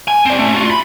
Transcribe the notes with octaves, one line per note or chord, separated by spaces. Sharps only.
G#5
C4 D5
A3 C#4
F4 F#4
B5 C6